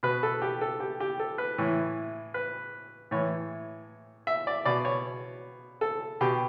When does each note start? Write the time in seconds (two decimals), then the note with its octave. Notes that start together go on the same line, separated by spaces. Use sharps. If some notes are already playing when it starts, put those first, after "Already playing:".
0.03 B2 B4
0.23 A4
0.42 G4
0.61 A4
0.80 G4
1.00 G4
1.19 A4
1.38 B4
1.58 A2 E3
2.34 B4
3.11 A2 E3 C#5
4.27 E5
4.47 D5
4.65 B2 D5
4.85 C#5
5.81 A4
6.21 B2 G4